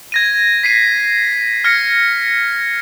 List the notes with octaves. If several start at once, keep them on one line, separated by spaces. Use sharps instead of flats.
G#6 A#6 D#7
B6 C7 D#7
F6 G#6 A#6 C#7